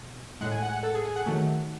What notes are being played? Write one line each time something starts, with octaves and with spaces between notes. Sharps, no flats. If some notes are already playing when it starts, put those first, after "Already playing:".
Already playing: B2
A2 G#3 F#5
G#5
F#5
F#5
A4
G#4
G#4
F#5
D#3 F#3 A3